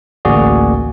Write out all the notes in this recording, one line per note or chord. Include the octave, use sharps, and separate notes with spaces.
A1 D2 A#3 F#4 G#4 D5